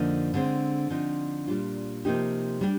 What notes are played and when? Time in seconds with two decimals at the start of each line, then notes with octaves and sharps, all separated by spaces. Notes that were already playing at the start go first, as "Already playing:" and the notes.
Already playing: F2 D3 F3 A#3 D#4
0.34 D3 G#3 C4
0.90 D3 F3 C4 D#4
1.47 A#2 G3 D4 F4
2.05 C3 F3 A#3 D#4 G4
2.61 G3 D4 G4